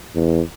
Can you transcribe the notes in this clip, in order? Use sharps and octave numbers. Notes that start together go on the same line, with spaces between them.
E2